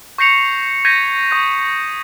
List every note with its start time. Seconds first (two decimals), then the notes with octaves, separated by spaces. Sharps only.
0.18 C#6 G6 A#6 C7 C#7 F7
0.85 G6 G#6 A#6 B6 D#7
1.31 C#6 D#6 G6